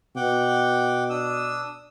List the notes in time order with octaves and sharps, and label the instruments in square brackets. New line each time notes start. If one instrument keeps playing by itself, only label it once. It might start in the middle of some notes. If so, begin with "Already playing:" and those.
[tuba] B2 [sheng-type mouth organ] F#5 G5 D6
[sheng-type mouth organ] D4 D#6 E6